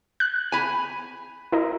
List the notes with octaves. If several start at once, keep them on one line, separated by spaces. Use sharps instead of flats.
F#6
G#5 B5
E4 A#4 D#5